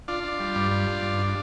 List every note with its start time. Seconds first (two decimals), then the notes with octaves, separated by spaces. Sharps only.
0.08 D4 F4
0.24 D4
0.40 G3
0.55 G2
0.71 G3
0.87 D4
1.03 G2
1.19 D4